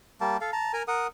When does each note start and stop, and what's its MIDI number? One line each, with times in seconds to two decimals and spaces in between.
0.21 0.37 55
0.21 0.37 58
0.21 0.37 81
0.41 0.51 69
0.41 0.51 77
0.53 0.72 81
0.53 0.72 82
0.73 0.83 70
0.73 0.83 80
0.73 0.83 82
0.88 1.07 70
0.88 1.07 78
0.88 1.07 87